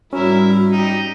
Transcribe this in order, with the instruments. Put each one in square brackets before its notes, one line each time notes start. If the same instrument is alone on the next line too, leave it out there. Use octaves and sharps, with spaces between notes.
[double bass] G#2 G3 [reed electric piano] C#4 [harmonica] E4 A#4 [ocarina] F#4
[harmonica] D#4 G4 D#5